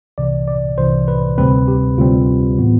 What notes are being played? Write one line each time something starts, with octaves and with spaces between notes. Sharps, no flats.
C2 C3 E3 D5
D5
C2 C3 E3 C5
B4
D2 C3 G3 C4 B4
G4
D2 C3 G3 C4 F4
A2 E3 B3